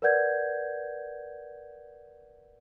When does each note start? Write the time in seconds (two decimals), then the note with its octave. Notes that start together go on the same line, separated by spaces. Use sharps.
0.02 A#4 B4 D5 F#5 G6 G#6